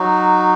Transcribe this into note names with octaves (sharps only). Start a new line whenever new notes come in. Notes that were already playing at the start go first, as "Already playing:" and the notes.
Already playing: F#3 D#4 F#4